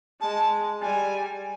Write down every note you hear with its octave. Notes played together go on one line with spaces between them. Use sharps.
G#3 A5
G3 G#5